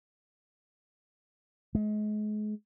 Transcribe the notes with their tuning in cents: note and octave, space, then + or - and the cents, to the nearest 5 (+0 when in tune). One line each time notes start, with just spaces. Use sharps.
G#3 +35